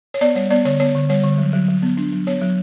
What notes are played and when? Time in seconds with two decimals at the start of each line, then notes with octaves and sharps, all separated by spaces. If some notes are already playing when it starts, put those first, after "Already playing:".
0.14 C#5
0.21 B3 D5
0.35 G3 C#5
0.51 B3 D5
0.65 D3 C#5
0.80 B3 C#5
0.95 D3
1.09 G3 C#5
1.24 D3
1.38 F#3
1.53 F#3
1.68 F#3
1.82 B3
1.97 D4
2.12 F#3
2.27 B3 C#5
2.41 F#3